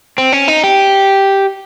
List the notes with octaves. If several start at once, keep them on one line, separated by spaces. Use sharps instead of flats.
C4
C#4
D#4
G4